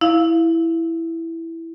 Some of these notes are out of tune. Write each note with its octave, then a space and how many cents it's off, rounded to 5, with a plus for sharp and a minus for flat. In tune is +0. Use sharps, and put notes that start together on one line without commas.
E4 +0 F5 -10